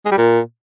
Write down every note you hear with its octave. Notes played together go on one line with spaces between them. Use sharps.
G#3
G3
A#2